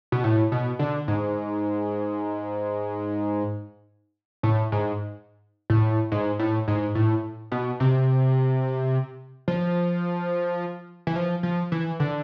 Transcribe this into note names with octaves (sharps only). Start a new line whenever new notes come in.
B2
A2
B2
D3
G#2
A2
G#2
A2
G#2
A2
G#2
A2
B2
C3
F3
E3
F3
F3
E3
D3